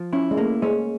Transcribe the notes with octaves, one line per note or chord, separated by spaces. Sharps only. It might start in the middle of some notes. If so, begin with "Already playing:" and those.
Already playing: F3
C#4 E4
G#3
A3 A#3
G#3 C#4